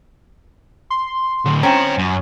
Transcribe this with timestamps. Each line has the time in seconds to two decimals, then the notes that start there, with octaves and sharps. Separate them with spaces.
0.90 C6
1.45 A2 D3
1.63 C4 C#4 G5 A#5
1.77 C#5
1.98 F#2